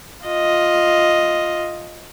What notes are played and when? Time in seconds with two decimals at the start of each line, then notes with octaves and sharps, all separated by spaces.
0.25 F4 D#5